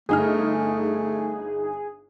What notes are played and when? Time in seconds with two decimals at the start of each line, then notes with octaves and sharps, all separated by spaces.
0.09 G1 A3 D#4 G#4 F6